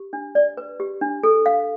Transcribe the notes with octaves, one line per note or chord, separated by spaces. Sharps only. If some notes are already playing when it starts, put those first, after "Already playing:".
Already playing: G4
D4
D5
B4
G4
D4
A4
F5